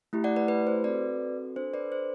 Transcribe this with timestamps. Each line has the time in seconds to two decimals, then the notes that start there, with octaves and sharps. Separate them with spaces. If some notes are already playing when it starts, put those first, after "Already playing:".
0.13 A3 E4 G4
0.24 D5 F#5
0.36 B4 D5
0.48 B4
0.67 C5
0.84 C4 F#4 A4 B4 D5
1.56 D4 A4 C5
1.74 B4 D5
1.92 C5